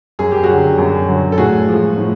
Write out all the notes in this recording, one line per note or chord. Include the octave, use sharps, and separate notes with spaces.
F#2 G#4
G4
F#4 G#4
D3 F#3
F#2
D3 F#3
A4
A2 F#4 G#4
F3 G#3
A2